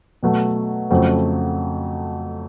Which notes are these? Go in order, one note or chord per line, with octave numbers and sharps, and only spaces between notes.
B2 F#3 A3
F2 C#3 F#3 A3 C4